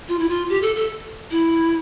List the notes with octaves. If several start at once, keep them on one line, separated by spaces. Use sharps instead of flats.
F4
E4
F4
G4
A4
A4
E4